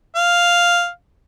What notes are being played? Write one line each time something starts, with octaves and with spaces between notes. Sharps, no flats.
F5